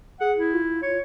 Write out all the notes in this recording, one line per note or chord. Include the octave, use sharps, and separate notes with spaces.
G#4 F#5
E4
F4
C#5